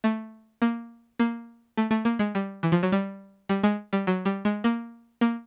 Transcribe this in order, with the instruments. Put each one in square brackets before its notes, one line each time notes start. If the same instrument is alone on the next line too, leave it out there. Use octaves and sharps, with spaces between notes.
[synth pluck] A3
A#3
A#3
A3
A3
A#3
G#3
G3
E3
F3
F#3
G3
G3
G#3
G3
F#3
G3
G#3
A#3
A#3